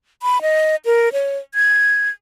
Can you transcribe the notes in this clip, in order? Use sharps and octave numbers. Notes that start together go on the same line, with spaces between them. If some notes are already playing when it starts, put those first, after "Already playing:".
B5
D#5
A#4
C#5
G#6